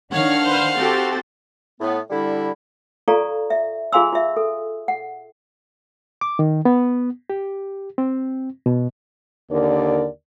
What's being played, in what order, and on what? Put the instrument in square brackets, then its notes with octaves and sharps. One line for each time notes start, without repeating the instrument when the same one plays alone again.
[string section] D#3 D4 F6 [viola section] C#5 [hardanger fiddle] F5 F#5
[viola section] B4 C5
[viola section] C4 F#4 G4 [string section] A4 A6
[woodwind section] A2 B3
D3 G3 E4
[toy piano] F4 A4 D5 F5 A#5 C#6
E5
F4 G#4 F5 G#5 C6 E6
F4 E5
A4
F#5
[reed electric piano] D6
D#3
B3
G4
C4
B2
[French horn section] D#2 D3 A#4 D5